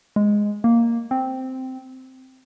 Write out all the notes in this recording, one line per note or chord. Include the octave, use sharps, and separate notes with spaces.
G#3
A#3
C4